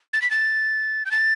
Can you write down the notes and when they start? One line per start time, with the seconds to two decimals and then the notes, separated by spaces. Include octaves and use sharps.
0.13 A6
0.22 B6
0.31 A6
1.06 G6
1.11 A6